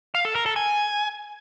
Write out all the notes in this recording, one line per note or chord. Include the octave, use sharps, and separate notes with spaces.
F5
A4
A#4
A4
G#5